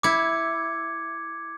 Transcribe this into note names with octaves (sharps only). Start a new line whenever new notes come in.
E4 D6 G#6 C#7